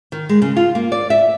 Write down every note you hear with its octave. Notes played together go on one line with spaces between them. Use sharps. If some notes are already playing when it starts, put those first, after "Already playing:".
D#3
G#3
C#3
F4
A#3
D5
E5